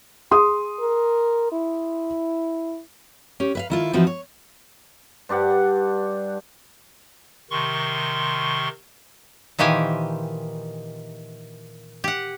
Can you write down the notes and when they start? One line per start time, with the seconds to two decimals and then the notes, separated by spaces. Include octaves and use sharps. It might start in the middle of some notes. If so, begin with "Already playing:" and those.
0.31 G#4 C6 D#6
0.80 A#4
1.52 E4
3.40 C#4 G4
3.55 B4 E5 F5
3.70 D#3 E4 F4
3.93 E3 F3 C4 D#4 E4 F#4
4.07 C#5
5.29 G2 D4 G4 F#5
7.51 C3 D#3 C6 C#6
9.59 A#2 D#3 E3 G4 C5 G#5
12.04 G4 F#5